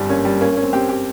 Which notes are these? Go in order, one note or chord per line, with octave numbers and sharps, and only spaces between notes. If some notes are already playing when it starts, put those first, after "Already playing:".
Already playing: G1 G3 C4
A#3 C#4
G3
A#3 C#4
A#3 C#4
C4
C4 G4
G4